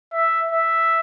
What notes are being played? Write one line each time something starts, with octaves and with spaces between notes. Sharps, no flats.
E5
E5